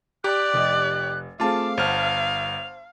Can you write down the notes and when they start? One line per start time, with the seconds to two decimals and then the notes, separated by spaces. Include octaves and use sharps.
0.24 G4 D5 F#6
0.54 F1 D#5 A6
1.40 A3 C4 F4 G#4 F5 A5 D6
1.77 G1 C5 F#5 A5 F6 F7